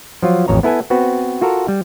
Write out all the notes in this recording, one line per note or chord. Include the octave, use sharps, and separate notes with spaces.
F3 F#3 F4
A1 F2 C#5 A#5
B3 E4 A4 B4 G#5
B3 C4 F#4 B4
F4 F#4 A4 A#4
G3